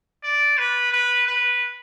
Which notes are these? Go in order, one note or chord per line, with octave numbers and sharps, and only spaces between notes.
D5
B4
B4
B4